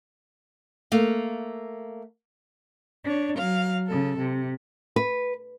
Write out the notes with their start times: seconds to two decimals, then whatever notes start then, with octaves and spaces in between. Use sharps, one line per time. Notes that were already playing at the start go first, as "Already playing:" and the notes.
0.92 A3 A#3 F5
3.03 D4 C#5
3.37 F#3 F5
3.86 C#3 A4
4.18 C3
4.96 B4